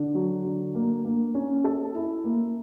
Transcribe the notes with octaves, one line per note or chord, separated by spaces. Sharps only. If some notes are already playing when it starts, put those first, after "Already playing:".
Already playing: D3
F#3
D3
A#3
A#3
C#4
A4
E4
A#3